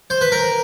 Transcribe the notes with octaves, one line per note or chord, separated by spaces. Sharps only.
C5
B4
A#4